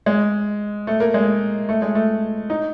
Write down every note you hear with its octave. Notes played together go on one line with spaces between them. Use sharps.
G#3
A3
A#3
G#3
A3
G#3
A3
D#4